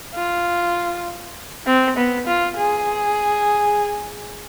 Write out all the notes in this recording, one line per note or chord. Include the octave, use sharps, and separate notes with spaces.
F4
C4
B3
F4
G#4